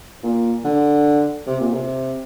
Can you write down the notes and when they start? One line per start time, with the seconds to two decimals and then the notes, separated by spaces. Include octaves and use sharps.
0.23 A#2
0.64 D3
1.47 C3
1.60 A#2
1.73 C3